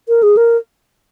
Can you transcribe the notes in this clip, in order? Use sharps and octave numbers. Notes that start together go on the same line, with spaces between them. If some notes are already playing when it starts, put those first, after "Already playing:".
A#4
G#4
A#4